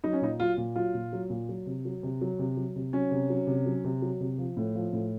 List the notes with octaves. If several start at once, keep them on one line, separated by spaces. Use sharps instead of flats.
F#3 D#4
C#4
A#2 D#4
F#3 F4
A#2
F#3 F4
A#2
F#3
A#2
F#3
C3
F#3
C3
F#3
C3
F#3
C3
F#3 C#4
C3
F#3
C3
F#3
C3
F#3
C3
F3
A2
F3
A2